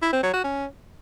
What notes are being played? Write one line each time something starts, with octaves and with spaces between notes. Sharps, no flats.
E4
C4
F#3
F#4
C#4